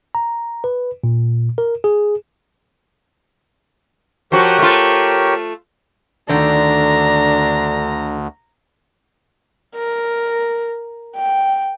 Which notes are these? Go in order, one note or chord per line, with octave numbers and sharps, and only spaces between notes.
A#5
B4
A#2
A#4
G#4
F3 F#4 G4 A#4 C#5
A3 F4
D2 D3 D#3 D4 A#5
A#4
G5